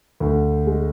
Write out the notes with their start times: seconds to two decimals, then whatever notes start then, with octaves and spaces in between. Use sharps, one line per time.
0.20 D2
0.66 G#3